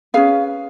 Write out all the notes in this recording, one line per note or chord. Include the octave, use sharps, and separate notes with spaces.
C#4 G#4 B4 F5